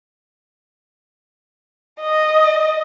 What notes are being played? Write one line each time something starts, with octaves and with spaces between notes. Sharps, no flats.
D#5